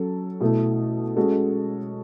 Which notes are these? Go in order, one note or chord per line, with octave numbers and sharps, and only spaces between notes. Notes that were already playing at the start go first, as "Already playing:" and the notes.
Already playing: F#3 C#4 F#4 A4
B2 A3 E4 A4
G#3 C#4 F#4 A4